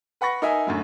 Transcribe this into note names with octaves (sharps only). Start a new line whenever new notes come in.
B4 F#5 B5 C#6 A#6
D#4 A#4 D#5 E5 G#5
F#2 A2 D3 F#3